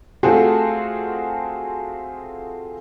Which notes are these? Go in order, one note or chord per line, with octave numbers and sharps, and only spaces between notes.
A3 C4 F4 F#4 G#4 A4